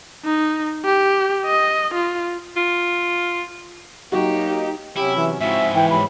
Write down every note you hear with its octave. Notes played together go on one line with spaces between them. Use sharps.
D#4
G4
D#5
F4
F4
F#3 A#3 D#4 F#4 G4
C3 F#3 C#4 E4 G4
E3
G#2 F3 C4 E4 F#4 E5
E3 G5
F#3 G#3 G4 B5